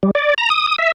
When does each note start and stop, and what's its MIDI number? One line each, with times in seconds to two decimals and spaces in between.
0.03 0.11 55
0.15 0.34 74
0.38 0.49 82
0.50 0.67 87
0.67 0.76 87
0.78 0.92 76